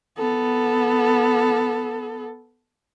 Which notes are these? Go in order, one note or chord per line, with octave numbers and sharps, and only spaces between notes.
B3 A4